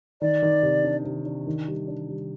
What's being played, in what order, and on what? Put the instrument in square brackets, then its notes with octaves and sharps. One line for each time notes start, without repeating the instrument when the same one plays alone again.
[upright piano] D#3 [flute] D5
[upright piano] D#3
C3
D4
C3
D4
D#3
G3
D4
G3